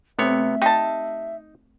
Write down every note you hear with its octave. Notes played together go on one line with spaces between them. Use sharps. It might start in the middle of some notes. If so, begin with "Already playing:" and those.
C3 A3 B3 C4 C#5 E5
D#4 G4 A5